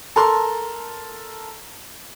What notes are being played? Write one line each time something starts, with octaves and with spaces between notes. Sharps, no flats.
A4 A#4 C6